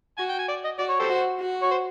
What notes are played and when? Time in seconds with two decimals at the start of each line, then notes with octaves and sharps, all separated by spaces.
0.18 F#4 G#5
0.29 G5
0.39 G#5
0.48 D5
0.64 D#5
0.79 F#4 D5
0.90 C#5
1.00 G4 A4 C5
1.09 F#4
1.40 F#4
1.62 C#5
1.71 C5